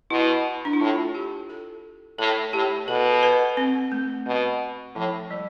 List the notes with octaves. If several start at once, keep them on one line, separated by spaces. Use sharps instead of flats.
B2 E4
D4
E4
A2 F4
G4
A4
A2 A4
A2 G4
B2 A4
B4
C4
A3
B2
A2 F3
G3